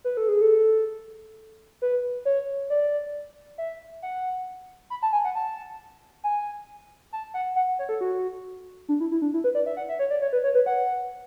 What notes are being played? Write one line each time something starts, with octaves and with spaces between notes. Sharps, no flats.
B4
A4
G#4
A4
B4
C#5
D5
E5
F#5
B5
A5
G#5
F#5
A5
G#5
A5
F#5
F#5
C#5
A4
F#4
D4
E4
E4
D4
E4
B4
D5
E5
F#5
E5
C#5
D5
C#5
B4
C#5
B4
F#5